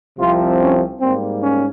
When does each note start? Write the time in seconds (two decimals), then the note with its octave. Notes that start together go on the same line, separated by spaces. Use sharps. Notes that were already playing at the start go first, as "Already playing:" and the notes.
0.17 C2 C3 F3 C4 F4
0.59 C#4
1.00 G#2 G3 A#3 C4
1.41 C#4